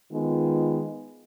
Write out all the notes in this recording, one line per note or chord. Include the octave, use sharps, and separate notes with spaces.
D#3 G#3 B3 F4